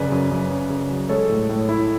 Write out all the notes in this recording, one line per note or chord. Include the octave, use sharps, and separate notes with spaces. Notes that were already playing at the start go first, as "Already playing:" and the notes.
Already playing: F#2 C#3 B4 D5
F#2
F#2
C#4
C#3
F#3
G#3 A4 C#5
A2
A2
E4